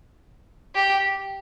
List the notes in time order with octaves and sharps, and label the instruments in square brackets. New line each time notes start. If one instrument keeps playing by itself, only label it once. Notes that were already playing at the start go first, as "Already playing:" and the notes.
[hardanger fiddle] G4